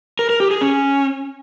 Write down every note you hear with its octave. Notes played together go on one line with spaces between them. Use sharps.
A#4
A#4
G4
G#4
C#4